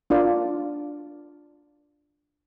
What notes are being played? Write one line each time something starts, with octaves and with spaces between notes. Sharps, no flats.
D4 F4 A#4 D5